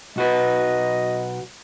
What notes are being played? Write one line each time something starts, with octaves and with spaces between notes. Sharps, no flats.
B1 F#4 B4 D#5